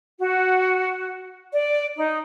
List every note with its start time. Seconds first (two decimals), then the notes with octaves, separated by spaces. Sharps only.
0.19 F#4
1.52 D5
1.96 D#4